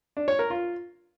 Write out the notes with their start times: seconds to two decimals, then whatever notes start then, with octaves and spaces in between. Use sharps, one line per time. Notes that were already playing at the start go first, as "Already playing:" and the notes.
0.17 D4
0.28 C#5
0.39 A#4
0.50 F4